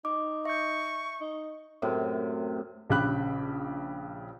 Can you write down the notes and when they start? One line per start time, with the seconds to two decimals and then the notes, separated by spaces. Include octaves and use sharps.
0.05 D#4 D6
0.45 E5 C#6 G6
1.21 D#4
1.82 F#2 A2 C3
2.90 A#1 C#3 G4 G5 B5 F#6